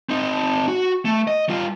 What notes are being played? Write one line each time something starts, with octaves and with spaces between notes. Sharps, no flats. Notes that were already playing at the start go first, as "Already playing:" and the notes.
C4 D#4
F#4
A3
D#5
G3 F4